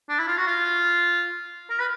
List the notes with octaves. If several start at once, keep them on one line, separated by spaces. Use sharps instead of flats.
D4
E4
F4
F#4
F4
A#4
B4